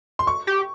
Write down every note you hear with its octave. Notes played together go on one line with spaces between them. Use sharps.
C6
C#6
G4